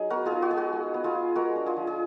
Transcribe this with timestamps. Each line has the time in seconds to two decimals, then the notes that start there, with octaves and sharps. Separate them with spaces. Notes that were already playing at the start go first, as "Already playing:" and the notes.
Already playing: F#3 D#4 G#4
0.10 B3 F#4 A#4
0.25 F4 G#4
0.32 D#4
0.42 F#4
0.51 G#3 G#4
0.57 F#4
0.73 G#3
0.94 B3
1.04 F4 G#4
1.15 F4
1.35 G#3 F#4 A#4
1.56 D4
1.66 F4 G#4
1.76 F3
1.87 G#4